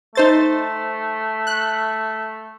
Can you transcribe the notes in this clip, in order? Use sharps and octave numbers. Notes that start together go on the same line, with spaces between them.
A3 D#4 C5 A6
F#6